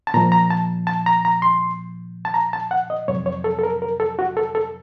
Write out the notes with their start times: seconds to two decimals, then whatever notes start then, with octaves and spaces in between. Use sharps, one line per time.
0.07 A5
0.14 A#2 A#5
0.17 F3
0.32 A#5
0.50 A5
0.87 A5
1.06 A#5
1.25 A#5
1.42 C6
2.25 A5
2.34 A#5
2.53 A5
2.71 F#5
2.90 D#5
3.08 F2 C3 F#3 C#5
3.26 C#5
3.44 A4
3.59 A4
3.63 A#4
3.82 A#4
4.00 A4
4.19 F#4
4.37 A4
4.55 A4